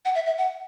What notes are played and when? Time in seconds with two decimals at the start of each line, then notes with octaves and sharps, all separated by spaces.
0.05 F#5
0.15 E5
0.26 E5
0.38 F#5